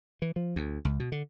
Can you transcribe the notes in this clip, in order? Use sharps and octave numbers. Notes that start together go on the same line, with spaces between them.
E3
F3
D2
C#2
B2
D3